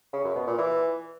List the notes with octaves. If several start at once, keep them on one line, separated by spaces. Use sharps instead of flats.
C#3
F#2
B2
A#2
E3